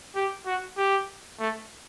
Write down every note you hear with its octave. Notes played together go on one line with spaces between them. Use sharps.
G4
F#4
G4
A3